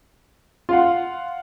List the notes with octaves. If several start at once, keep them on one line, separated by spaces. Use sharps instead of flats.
F4 F5 F#5